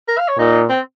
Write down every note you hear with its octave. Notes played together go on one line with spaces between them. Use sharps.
A#4
F5
C#5
A#2 D#4
C4